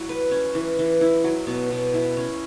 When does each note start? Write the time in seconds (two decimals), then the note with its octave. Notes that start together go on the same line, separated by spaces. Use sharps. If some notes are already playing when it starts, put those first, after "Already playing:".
Already playing: F#3 E4
0.09 B4
0.31 C#4
0.55 E3
0.79 E3
1.01 E4
1.24 F#3
1.47 B2
1.70 B2
1.94 E4
2.17 C#4